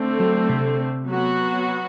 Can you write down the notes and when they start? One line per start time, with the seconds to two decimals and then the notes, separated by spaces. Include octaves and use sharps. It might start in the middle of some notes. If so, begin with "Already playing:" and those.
Already playing: D3 A3 C4
0.20 F#3
0.49 C3
1.06 F#3 B3 F#4